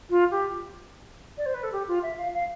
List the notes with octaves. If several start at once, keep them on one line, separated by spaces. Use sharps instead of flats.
F4
G4
D5
C5
B4
A4
G4
F4
E5
F5
F5